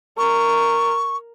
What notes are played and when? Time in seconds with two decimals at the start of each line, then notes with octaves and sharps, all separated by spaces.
0.18 A#4 C#6